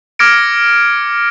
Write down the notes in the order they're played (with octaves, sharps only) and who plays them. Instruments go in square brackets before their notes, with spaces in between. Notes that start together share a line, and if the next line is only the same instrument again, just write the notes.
[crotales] D6 F6 G#6 A#6 C#7 D7